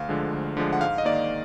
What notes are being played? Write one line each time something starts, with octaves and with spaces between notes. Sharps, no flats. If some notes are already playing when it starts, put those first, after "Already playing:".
Already playing: D2 F5
D3 F3 G#3
D2
D3 F3 G#3
F#5
G#2 F5
D#5
D#3 A#3 D5